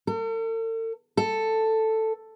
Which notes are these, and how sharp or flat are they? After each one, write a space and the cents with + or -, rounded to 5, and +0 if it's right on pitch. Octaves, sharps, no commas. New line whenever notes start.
A4 +45
A4 +5